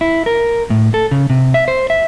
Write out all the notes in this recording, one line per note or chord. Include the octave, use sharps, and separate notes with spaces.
E4
A#4
A2
A4
C#3
C3
E5
C5
E5